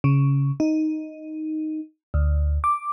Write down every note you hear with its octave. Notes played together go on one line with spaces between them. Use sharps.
C#3
D#4
D2
D6